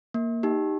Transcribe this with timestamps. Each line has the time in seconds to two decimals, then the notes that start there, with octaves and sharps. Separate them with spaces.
0.14 A#3
0.43 D#4 G4